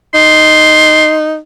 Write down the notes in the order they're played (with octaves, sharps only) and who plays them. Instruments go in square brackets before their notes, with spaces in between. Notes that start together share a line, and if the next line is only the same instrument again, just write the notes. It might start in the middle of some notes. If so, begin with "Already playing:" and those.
[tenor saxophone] D#4 [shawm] C6